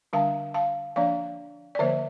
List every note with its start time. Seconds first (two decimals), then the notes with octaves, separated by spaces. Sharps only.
0.13 D3 G3 D4 F5 A5
0.54 F5 A5
0.96 F3 A#3 D4 D5 F5
1.75 D5
1.79 D3 F3 A#3 C5 E5